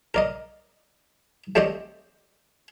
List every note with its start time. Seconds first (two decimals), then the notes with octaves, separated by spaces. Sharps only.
0.14 A#4 D5 D#5
1.55 A3 C4 G4 D5 D#5